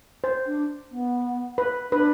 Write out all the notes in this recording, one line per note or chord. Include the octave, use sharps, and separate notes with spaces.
C5
D4
B3
B4
D4 B4